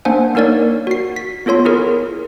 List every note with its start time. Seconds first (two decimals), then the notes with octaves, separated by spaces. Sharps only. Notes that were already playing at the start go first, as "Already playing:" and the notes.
0.05 A#3 D4 C5 F#5 G#5
0.35 A#3 D#4 A#4 C#5 D5
0.87 F#4 C7
1.16 B6
1.46 B3 F4 A4 C#5 C6
1.65 E4 G#4 A#4